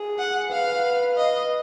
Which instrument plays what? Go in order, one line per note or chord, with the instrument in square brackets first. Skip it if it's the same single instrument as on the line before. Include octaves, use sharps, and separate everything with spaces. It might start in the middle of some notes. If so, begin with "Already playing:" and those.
Already playing: [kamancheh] G#4
[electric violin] F#5
[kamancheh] B4 [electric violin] F5
[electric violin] D#5